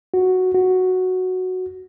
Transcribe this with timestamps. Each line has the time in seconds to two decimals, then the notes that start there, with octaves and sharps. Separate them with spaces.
0.14 F#4
0.55 F#4